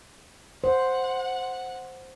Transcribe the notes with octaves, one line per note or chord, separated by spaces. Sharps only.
C5 F#5